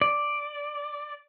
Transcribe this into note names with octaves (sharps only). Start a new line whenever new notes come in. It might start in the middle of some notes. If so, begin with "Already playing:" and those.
D5